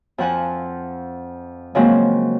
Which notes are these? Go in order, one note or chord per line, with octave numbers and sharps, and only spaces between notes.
F2 F3 F#5 G#5
C#3 F3 F#3 G#3 A#3 C4